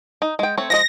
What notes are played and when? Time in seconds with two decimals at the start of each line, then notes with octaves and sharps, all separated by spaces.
0.22 D#4
0.39 G#3 G5
0.57 A3 C4 C#5
0.70 F3 G#3 D#5 A#6